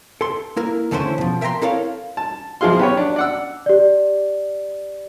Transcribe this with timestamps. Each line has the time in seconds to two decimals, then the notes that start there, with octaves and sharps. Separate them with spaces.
0.21 A4 C6
0.56 A#3 E4 A#4
0.91 E2 D3 A3 C#4 E4 C5
1.18 B2 F3
1.41 A#4 E5 G5 G#5 A#5 C6
1.62 C4 E4 A4 A#4 C#5 F5
2.17 A5
2.61 B1 F3 E4 G#4 F5 C6
2.79 B3 G4 C#5
2.97 D4
3.16 D5 F#5 E6
3.66 G4 D5